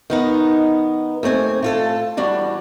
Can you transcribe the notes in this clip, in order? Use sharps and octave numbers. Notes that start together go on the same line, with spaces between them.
D#3 B3 D#4
D#2 A3 C4 G#5
A3 F4 A4
E3 G3 D4 F#4